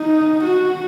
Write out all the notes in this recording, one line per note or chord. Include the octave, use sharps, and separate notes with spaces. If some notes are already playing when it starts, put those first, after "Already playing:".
Already playing: D#4
F#4